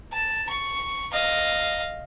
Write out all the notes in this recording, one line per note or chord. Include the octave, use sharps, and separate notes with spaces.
A5
C#6
D#5 F5